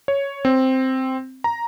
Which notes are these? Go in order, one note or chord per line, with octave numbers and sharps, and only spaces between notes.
C#5
C4
A#5